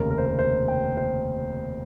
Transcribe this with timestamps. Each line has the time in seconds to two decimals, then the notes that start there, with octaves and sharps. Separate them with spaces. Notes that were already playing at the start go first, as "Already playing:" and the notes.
Already playing: F1 D#2 C#3 A#4
0.10 A#4
0.18 C5
0.26 A#4
0.39 C5
0.68 G5
0.97 C5